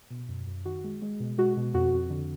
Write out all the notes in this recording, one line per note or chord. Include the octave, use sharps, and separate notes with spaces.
B2
F#2
F#2
D#3 F#4
G#3
G#3
B2
G#3 F#4
B2
F2 F#4
F2
D3